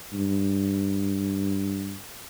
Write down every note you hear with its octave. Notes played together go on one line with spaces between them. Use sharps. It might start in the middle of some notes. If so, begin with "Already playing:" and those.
G2